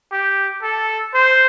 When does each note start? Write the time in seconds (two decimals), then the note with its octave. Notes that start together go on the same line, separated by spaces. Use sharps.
0.12 G4
0.63 A4
1.14 C5